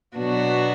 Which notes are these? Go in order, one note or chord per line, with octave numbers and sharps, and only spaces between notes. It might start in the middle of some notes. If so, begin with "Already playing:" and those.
B2 F#3 B3 D4 F#4